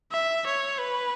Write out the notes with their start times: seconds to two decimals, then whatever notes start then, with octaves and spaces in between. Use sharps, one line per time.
0.12 E5
0.46 C#5
0.79 B4